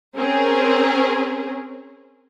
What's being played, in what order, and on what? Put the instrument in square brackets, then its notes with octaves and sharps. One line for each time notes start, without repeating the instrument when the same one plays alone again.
[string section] C4 C#4 G#4 A#4 C5